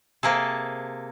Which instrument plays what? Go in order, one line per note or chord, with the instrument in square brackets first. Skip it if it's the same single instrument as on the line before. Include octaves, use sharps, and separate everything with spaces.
[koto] C3 A#3 G#4 A4